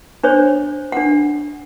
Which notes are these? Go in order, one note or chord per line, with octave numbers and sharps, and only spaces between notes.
D4 C5 C#5
D4 F#5